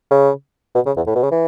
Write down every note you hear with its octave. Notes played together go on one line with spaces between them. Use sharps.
C#3
B2
C#3
E2
A2
B2
C#3
E3